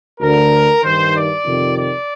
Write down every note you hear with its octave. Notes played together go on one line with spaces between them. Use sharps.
D2 D3 A#4
G2 D#3 C5
D5
F2 C3 D#3
D5